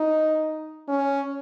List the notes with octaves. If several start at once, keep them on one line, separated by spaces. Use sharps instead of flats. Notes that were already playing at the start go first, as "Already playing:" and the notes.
Already playing: D#4
C#4